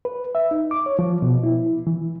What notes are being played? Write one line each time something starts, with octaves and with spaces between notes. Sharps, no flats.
B4
E5
D#4
D6
C#5
F3
B2
E4
E3